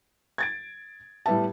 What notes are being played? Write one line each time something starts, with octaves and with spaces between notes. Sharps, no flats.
G#6 A6 D7
A2 G3 B3 E5 A5